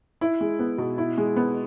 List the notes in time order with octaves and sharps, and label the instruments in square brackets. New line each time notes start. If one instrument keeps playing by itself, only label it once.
[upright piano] E4
G#3
B3
B2
E4
G#3
B3